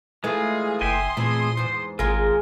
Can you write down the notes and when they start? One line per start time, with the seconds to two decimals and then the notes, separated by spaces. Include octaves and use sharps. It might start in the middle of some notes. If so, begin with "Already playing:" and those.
0.24 E3 G#3 A3 D#4 F4 G#4
0.81 F#1 E5 G5 G#5 C6 D#6
1.17 E2 A#2 A3 C4 G#4
1.57 E2 G#2 C5
1.99 G#1 D#2 G#3 F4 G#4 A#4